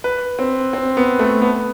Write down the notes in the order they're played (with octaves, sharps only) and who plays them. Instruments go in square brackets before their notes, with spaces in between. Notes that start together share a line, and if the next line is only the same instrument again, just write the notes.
[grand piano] B4
C4
C4
B3
A3
B3